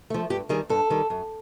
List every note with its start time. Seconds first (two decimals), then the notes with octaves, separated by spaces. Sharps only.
0.10 F3 A3
0.30 G2 G4
0.49 D#3 G3 G#4
0.69 G2 A4
0.90 D#3 G3
1.10 F#2